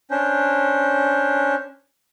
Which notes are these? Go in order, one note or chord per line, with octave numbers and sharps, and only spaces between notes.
C#4 D4 C5